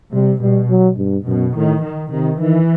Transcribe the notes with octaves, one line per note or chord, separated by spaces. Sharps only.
C3 G3
B2 G3
F#3
G2
F#2 B2
A2 D#3
D#3
C3 D#3
D#3 E3